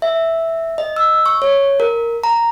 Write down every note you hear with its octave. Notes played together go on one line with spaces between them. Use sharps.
E5
D#5
E6
C#6
C#5
A#4
A#5